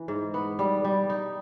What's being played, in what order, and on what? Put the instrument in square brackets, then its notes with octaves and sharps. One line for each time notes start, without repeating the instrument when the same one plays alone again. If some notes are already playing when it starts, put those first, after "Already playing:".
Already playing: [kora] E3
G#2
B3
G3
G3
D#4